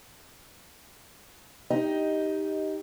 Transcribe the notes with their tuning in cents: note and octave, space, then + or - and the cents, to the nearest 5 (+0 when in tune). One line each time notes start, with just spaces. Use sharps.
D#4 +5 G4 +0 D#5 +10